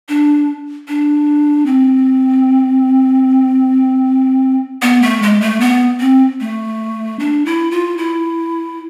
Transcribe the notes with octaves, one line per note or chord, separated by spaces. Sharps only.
D4
D4
C4
B3
A3
G#3
A3
B3
C4
A3
D4
E4
F4
E4